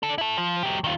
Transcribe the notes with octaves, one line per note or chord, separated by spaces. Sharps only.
D4 A4
E4 A4
F3
F#3 G4
D#3 F4